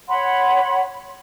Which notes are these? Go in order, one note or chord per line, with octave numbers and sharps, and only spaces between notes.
C#5 F#5 B5 C6